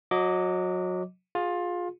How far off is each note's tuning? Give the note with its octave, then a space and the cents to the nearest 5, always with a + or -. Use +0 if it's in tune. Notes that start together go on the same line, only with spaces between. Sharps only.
F#3 -25 D#5 +0 D6 -15
F4 +20 G#4 -5